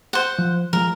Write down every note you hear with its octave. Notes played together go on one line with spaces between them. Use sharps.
C5 F#5
F3
F3 G#3 A#4